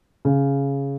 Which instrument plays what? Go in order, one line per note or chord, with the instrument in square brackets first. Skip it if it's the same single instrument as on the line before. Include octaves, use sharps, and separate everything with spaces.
[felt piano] C#3